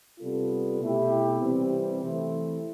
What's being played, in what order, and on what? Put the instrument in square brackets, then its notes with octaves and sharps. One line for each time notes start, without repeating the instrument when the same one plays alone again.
[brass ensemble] C3 G3 B3 F4 A4
B2 A3 E4 G4
C3 E3 G3 C4 G4
E3 A3 C4 E4